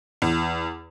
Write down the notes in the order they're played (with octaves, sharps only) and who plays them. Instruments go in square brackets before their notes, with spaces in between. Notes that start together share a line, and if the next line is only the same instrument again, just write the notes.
[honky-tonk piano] E2